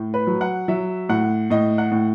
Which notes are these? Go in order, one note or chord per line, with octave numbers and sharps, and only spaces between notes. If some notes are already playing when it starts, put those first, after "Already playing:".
Already playing: A2
B4
F#3
F#5
F#3 E5
A2 F#5
A2 D#5
F#5
A2